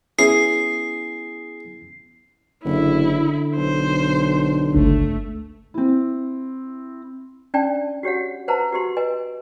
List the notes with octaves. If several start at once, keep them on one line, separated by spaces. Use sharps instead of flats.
B3 C#4 E4 G#4 C7
F#1 D3 E4
B1 C5
G1 C#2 A3 D4
C4 E4
C#4 D4 D5 G5 A5
F#4 G4 C#5 F#5
B4 C5 F#5 A5 A#5
F#4 G4 C6
B4 D#5 G#5